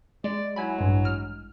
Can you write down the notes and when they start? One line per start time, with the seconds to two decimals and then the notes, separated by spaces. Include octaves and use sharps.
0.24 G#3 D5
0.56 F#3 E4 G#5 B5
0.78 A1 G2 G#3
1.05 F6